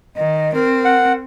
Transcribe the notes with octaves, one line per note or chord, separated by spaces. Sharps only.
D#3 D#5
C4 A#4
F#5